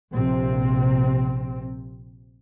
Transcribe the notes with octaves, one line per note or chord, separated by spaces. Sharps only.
A#1 C3 C4